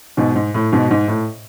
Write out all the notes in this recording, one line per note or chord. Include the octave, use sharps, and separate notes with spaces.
G#2 B2
G#2
A2
G#2 B2
G#2
A2